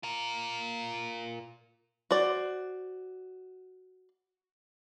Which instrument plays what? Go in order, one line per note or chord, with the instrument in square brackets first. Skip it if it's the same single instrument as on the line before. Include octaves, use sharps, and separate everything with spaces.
[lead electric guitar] F4 A#4
[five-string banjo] F#4 C5 D5